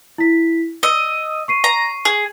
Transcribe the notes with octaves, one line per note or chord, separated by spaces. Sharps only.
E4 B6
D#5 E6
C#6 C7 D#7
A#5
G#4